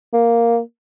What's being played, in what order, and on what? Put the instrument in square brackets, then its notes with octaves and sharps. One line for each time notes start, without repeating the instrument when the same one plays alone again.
[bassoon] A#3